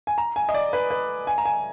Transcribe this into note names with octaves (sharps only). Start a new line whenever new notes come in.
G#5
A#5
G#5
D#5
D5
B4
B4
G#5
A#5
G#5